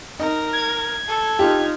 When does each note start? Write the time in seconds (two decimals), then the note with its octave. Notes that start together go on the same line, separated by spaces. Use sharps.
0.19 D#4 A#4
0.53 G#6
1.08 A4
1.39 D#4 F4 G4